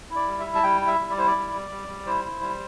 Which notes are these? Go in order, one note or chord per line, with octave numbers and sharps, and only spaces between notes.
E4
D5
G3
E5
E4
A5
G3 G5
E4
E5
G3
D5
E4 C5
D5
G3
G3
G3
G3
E4 C5
E4
G3